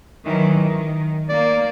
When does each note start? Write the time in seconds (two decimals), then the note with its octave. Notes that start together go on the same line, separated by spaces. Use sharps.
0.24 D#3 E3 F#3
0.54 D#3
1.29 A#3 D5